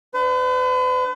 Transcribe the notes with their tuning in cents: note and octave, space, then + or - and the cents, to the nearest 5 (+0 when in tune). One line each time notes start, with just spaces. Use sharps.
D4 +0 B4 +45